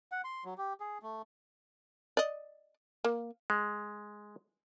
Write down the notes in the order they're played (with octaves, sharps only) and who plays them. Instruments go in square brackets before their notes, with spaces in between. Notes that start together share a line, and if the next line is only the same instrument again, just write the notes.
[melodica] F#5
C6
F#3
G4
G#4
A3
[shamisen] D5 D#5
A#3
[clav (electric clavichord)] G#3